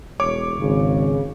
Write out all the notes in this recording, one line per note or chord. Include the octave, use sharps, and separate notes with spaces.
E1 C#5 D6
G#1 C#3